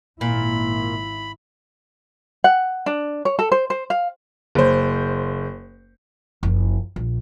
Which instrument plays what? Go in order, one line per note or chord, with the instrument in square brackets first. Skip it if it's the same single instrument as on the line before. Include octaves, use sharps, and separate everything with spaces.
[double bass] G#1 E4 [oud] A#2 [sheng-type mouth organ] B5
[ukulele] F#5
D4
C#5
A4
C5
C5
F5
[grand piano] F#1 C5
[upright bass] F#1 F3
A#1